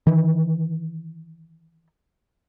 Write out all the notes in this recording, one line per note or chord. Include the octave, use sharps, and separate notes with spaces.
D#3 E3